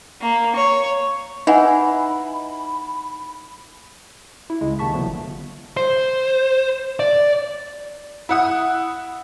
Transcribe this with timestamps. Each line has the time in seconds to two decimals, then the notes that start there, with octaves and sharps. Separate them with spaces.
0.21 A#3
0.56 C#5
1.47 E3 D#4 F#5 G#5 B5
4.50 E4
4.61 C#2 C#3 G#3
4.79 C3 D#3 A#3 A5 C#6 B6
4.92 D3 F3 F#3 A3 B3
5.06 G1
5.77 C5
7.00 D5
8.29 E4 F#5 D#6